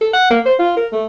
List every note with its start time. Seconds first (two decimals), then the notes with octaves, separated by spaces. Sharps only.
0.02 A4
0.14 F#5
0.31 A#3
0.46 C5
0.59 F4
0.77 A#4
0.93 A3